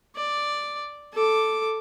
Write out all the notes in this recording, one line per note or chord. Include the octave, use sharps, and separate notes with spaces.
D5
A4 D6